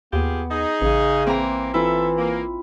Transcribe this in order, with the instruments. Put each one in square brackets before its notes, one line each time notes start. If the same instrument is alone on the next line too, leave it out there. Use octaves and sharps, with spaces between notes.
[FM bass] D#2 [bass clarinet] B3 [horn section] F4 G4 G#4
[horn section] D#4 G#4
[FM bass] A1 [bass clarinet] C#3
[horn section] E3 A#3 [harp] C4 A#5
[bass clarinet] E3 [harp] E4 F4 [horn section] A4 E5
[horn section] A#3